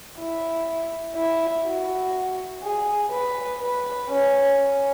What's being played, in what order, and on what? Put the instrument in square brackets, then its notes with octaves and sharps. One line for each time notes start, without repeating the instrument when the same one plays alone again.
[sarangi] E4
E4
F#4
G#4
B4
B4
C#4
C#4